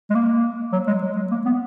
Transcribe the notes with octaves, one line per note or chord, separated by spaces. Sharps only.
G#3
A#3
F#3
G#3
F#3
G#3
A#3
B3